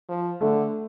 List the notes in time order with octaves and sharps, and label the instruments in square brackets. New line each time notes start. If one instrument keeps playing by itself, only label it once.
[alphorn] F3
[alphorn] D3 [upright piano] A3